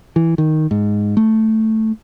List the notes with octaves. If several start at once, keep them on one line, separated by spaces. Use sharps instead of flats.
E3
D#3
G#2
A3